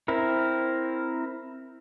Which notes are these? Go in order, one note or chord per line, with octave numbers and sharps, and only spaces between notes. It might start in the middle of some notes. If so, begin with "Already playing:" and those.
C4 E4 A#4